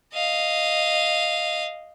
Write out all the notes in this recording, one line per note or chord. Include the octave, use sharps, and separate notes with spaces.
D#5 F5